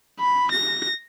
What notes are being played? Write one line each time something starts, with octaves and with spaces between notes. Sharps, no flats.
B5
A#6